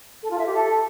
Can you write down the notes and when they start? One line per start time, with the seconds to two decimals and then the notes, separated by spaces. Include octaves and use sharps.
0.23 A4
0.31 F4
0.38 E5
0.46 G4
0.54 A4